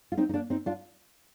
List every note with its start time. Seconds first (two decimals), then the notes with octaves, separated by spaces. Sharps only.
0.12 F4
0.17 C4 D#4
0.29 D#4
0.34 A#3 D4
0.50 C4 D#4
0.66 D4 F4